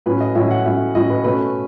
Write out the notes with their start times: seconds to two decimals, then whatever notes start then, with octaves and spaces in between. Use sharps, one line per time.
0.06 A2 F#3 C#4 B4
0.20 D#5
0.35 A2 F#3 C#4 E5
0.51 F#5
0.65 A2 F#3 C#4 E5
0.95 A2 F#3 C#4 D#5
1.10 B4
1.24 B2 A3 C#4 B4